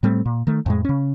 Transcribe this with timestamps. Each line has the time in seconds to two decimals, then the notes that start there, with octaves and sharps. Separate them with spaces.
0.03 A2 G3 A3 C4
0.26 A#2
0.47 D#3 A3
0.66 F2 A2 G#3
0.85 C#3 C#4